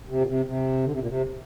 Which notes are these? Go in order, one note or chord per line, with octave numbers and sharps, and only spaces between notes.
C3
A#2
C3
C3
D3
C3
A#2
C3